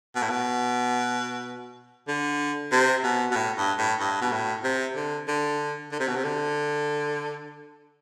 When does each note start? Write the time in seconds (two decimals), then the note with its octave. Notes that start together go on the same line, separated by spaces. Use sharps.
0.16 B2
0.23 A2
0.30 B2
2.08 D3
2.72 C3
3.04 B2
3.31 B2
3.36 A2
3.58 G2
3.79 A2
4.00 G2
4.21 B2
4.32 A2
4.64 C3
4.96 D3
5.28 D3
5.92 D3
6.00 C3
6.08 B2
6.16 C3
6.24 D3